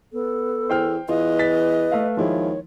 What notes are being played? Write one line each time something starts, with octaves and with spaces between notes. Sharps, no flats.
B3 A4
E2 C5 G5 F6
E2 F4 B4 D#5
A6 B6
A3 F5
D#2 F3 G#3 E4 C#5